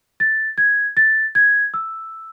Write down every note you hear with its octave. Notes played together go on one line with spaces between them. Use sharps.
A6
G#6
A6
G#6
E6